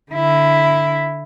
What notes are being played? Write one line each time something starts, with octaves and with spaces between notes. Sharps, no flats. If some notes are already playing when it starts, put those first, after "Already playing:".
D3 E4